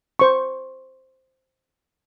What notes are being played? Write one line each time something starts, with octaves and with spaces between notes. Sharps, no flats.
C5 C#6